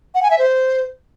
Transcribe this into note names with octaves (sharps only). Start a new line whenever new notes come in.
F#5
G#5
E5
C5